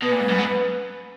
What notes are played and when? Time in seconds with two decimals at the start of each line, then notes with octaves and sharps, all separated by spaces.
0.02 B2 B4
0.11 A#2
0.20 G#2
0.29 F#2
0.38 G#2